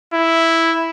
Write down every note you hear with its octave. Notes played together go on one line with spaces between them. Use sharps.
E4